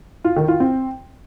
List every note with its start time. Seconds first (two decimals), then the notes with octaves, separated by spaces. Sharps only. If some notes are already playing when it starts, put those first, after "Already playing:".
0.24 F4
0.36 D#3
0.48 F4
0.60 C4